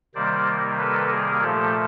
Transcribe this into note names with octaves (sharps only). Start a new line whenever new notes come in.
C3 D#3 G3 A#3 C5 D5
A4 B4
G#4 A#4
A#2 F3 A3 G4 A4